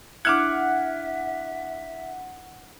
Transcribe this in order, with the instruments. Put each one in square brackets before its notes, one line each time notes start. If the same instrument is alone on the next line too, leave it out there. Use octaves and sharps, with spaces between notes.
[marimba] D4 E4 [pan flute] E5 [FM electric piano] F#5 [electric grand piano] D6 F6 G#6